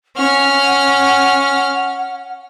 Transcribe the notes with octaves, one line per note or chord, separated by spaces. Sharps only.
C#4 F#5 F6